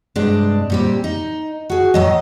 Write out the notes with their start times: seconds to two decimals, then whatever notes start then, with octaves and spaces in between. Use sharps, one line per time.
0.16 G2 C3 G#3 D4
0.70 A#2 G3 C4
1.04 D#4
1.70 F#4 G#4
1.94 A2 F#3 D#5